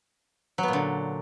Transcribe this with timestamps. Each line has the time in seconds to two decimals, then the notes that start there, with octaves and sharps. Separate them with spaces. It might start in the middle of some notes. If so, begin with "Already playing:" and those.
0.58 F#3
0.63 B3
0.68 A#2
0.73 D3